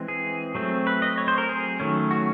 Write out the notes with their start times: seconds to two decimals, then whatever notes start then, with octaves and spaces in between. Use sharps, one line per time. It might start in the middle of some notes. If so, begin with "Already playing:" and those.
Already playing: E3 G#3 C4
0.08 G#4
0.55 F#3 A3 C4
0.87 B4
1.02 D#5
1.18 C#5
1.28 C5
1.38 A#4
1.49 G#4
1.80 D#3 F#3 A3 C#4
2.11 F#4